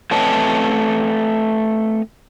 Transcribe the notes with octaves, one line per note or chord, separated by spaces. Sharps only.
A3 C4 B4 C#5 D#5 A5